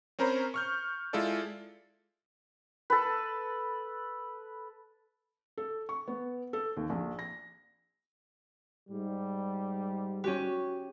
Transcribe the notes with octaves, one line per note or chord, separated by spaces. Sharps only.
C4 C#4 A#4 C5 A#5 B5
C#6 F6 G6
G#3 E4 F4 A4 D5
A4 B4
A4
C#6
B3
A4
D#2
A#1
A#6
G#2 G3
C#4 F#4 G4 C#6